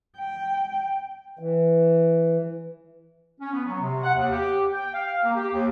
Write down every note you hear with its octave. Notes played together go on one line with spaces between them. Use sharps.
G5
E3
C#4
B3
F#3
C3
F#5
D#2
G4
G5
F5
A#3
G4
D#2